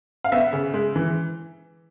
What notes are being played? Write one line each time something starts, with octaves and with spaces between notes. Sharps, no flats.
F5
B3 E5
C#3
G#3
E3